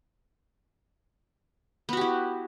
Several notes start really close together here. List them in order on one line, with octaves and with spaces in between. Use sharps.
B3 F#4 G4 E4